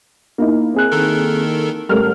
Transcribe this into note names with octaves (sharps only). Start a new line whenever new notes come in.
A#3 D#4 E4
C4 G#4 F#6
D#3 A4 A#4
A1 G3 G4 A4 A#4 F6